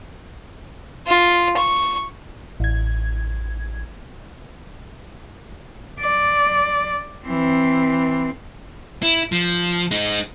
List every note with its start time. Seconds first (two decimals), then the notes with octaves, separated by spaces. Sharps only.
1.07 F4
1.57 C#6
2.60 A1 G#6
6.00 D5
7.26 E3 C4
9.03 E4
9.32 F3
9.91 G#3 D#4